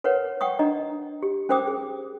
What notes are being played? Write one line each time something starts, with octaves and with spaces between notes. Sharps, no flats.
A#4 B4 C#5 F#5
F#5 G5 C#6 D#6
D4 D#5 A#5
G4
C#4 A#4 C5 G5 D6 D#6
G#4